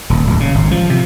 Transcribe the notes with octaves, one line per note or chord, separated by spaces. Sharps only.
D#1
D1
C#3
G#1
F3
C3